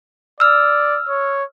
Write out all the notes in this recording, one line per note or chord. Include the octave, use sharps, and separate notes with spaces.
D5 E6 F6
C#5